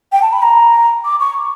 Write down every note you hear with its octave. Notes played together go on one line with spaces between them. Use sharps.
G5
A5
B5
A#5
D6
C#6